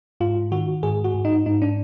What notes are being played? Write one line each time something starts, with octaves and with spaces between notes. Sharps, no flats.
G#2 F4
D#3 F#4
G#2 G#4
F#4
G#2
D#4
G#2 D#4
D4